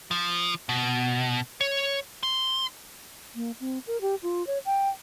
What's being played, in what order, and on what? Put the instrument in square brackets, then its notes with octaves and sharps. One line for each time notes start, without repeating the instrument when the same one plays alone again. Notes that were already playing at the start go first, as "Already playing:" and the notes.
[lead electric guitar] F3
B2
C#5
C6
[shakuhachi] A#3
C4
A#4
G4
F4
C#5
G5